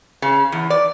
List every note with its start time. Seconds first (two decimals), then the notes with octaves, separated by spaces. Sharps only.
0.22 C#3
0.52 E2
0.70 D5